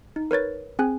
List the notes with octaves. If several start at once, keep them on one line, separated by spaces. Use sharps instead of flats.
D#4
A#4 B4 C#5 A6
C4 G#4 G#5 F#6